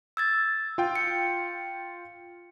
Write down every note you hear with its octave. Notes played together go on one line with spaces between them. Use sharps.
E6 G#6 A6
F4 G5
C#7